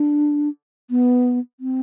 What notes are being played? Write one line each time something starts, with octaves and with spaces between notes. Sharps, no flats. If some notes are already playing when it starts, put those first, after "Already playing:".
Already playing: D4
B3
C4